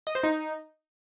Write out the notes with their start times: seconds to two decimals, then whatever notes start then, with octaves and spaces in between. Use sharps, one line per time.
0.07 D#5
0.15 C5
0.23 D#4